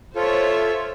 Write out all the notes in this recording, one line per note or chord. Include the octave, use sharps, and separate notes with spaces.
F4 A4 C5 C#5 E5